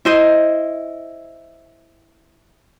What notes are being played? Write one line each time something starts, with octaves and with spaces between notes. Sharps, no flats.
E4 C5 D#5